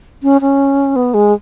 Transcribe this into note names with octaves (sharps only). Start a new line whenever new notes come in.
C#4
C#4
B3
G#3